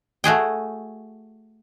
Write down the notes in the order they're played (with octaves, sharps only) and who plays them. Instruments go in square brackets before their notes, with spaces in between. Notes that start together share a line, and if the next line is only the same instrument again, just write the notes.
[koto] A3 F#4 G#4 G5